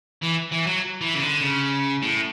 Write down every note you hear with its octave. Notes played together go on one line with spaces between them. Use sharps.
E3
E3
F#3
E3
C#3
D3
C#3
A2